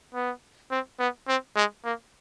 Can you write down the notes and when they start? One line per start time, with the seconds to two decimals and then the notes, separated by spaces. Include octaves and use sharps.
0.15 B3
0.71 C4
1.00 B3
1.28 C4
1.56 G#3
1.85 A#3